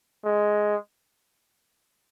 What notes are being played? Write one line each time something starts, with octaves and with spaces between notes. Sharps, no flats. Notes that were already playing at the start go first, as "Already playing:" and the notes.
G#3